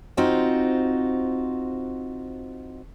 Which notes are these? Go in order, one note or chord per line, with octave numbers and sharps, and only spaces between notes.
C4 D#4 F4 F#4 C5